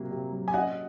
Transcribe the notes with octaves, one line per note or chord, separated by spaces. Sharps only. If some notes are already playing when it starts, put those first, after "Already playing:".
Already playing: C3 F#3 A#3
C3
F#3
G#5
C#4 D#5 F#5